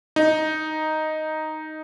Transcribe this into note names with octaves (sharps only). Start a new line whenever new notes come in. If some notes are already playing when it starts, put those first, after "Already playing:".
D#4